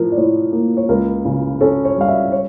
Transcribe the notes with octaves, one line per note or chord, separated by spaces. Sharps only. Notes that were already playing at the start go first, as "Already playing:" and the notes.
Already playing: A2 F3 A#4
D5
A2 C#5
A#3
C#5
C#2 A#4
C#3
C#4 A4
C#5
G3 F5
E5
C#5